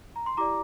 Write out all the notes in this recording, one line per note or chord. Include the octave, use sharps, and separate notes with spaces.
A#5
C6
E4 G4 D5 A#5 D6